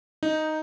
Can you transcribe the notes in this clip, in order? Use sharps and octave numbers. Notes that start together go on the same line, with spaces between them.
D#4